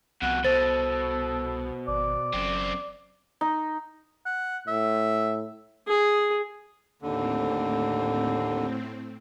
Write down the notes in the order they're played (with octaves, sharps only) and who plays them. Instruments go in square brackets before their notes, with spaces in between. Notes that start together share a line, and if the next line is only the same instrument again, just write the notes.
[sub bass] C2 [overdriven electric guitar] F2 B2 [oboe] F#5
[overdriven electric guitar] B2 [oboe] A4 [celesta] C5 A6
[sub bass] G#1 [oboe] D5
[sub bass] F#1 [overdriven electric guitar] F#2 C4
[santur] D#4
[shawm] F#5
[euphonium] A2 [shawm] E5
[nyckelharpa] G#4
[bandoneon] D#2 D3 [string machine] A2 C4